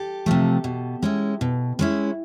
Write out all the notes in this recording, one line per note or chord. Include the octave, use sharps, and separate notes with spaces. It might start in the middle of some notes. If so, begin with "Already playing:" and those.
Already playing: G4 A4
C3 F3 A3
B2
G#3 C#4 E4
B2
G#3 C#4 E4